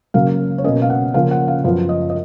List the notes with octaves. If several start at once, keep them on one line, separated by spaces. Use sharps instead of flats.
C#3 F#3 A#3 F5
C#5
B2 A#3 C#4 D#5
F5
F#5
C#3 F3 A#3 C#4 F5
F#5
F5
F#2 F3 B3 F5
D#5
D#5